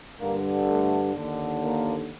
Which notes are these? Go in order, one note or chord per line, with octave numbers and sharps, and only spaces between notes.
G2 D3 A#3
A3
D#2 D3
A#3